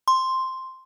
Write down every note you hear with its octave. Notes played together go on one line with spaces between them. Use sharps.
C6